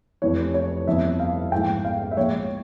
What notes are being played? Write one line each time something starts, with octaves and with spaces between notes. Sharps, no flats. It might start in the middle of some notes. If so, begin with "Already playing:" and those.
F1 F2 E3 C#5
C#5
G1 F2 E3 E5
F5
A#1 G#2 E3 G#3 G5
F5
E5
A#1 A#2 G#3 C#5